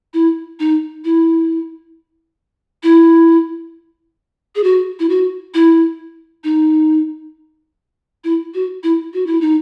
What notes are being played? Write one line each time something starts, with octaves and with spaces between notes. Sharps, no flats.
E4
D#4
E4
E4
G#4
F#4
E4
F#4
E4
D#4
E4
F#4
E4
F#4
E4
D#4